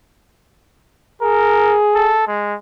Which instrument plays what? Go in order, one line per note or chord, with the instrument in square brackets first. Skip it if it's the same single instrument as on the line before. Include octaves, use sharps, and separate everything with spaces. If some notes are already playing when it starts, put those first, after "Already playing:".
[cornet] G#4 [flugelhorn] A#4
[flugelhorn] A4
G#3